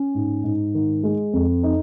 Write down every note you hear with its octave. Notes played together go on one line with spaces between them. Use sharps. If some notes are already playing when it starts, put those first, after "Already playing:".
Already playing: C#4
G#2
G#2
D#3
G#3
F2
D#4